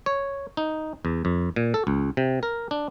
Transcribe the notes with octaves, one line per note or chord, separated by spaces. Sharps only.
C#5
D#4
E2
F2
A#2
A4
C#2
C3
A#4
D4